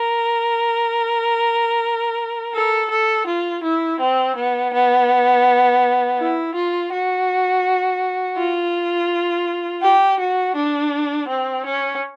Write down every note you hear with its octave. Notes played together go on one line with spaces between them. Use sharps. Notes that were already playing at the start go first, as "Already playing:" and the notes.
Already playing: A#4
A4
A4
F4
E4
C4
B3
B3
E4
F4
F#4
F4
G4
F#4
D4
C4
C#4